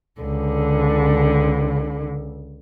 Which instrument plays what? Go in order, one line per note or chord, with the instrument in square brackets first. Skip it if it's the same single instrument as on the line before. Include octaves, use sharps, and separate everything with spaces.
[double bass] C#2 [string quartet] D3